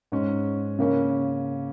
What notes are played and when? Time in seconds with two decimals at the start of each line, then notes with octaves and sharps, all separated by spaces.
0.12 G#2 G#3 C#4
0.79 C#3 A#3 C#4